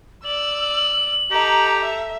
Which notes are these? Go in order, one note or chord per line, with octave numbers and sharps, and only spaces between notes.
D5 E6 F#7
D#4 G4 A4 A#5
E5